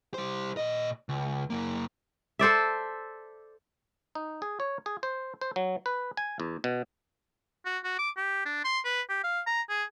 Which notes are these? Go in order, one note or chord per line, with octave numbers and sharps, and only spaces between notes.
G3 C5
A#2 D#5
C#2
F#2 A#3
A4 C5 D5 E5
D#4
G#4
C#5
G#4
C5
C5
F#3
B4
G#5
E2
B2
F#4
F#4
D6
G4
D4
C6
B4
G4
F5
A#5
G#4